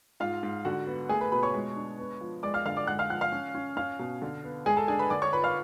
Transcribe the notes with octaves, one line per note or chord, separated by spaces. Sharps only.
G#2 F4 F5
G#2
D3 F#4 F#5
B3
A3 G#4 G#5
B4 B5
B2 B4 B5
C#5 C#6
G#3
D4
B3
F3
G#3 D5 D6
F5 F6
D3 F5 F6
D5 D6
G#3 F#5 F#6
F5 F6
F3 F#5 F#6
F5 F6
C#4
C#4
C#4 F5 F6
B2
D3
B3
G#3 G#4 G#5
A4 A5
D4 G#4 G#5
B4 B5
D3 D5 D6
C#5 C#6
F4 B4 B5
F5 F6